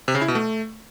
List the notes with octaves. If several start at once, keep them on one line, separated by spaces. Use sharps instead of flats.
C3
C#3
E4
B2
A3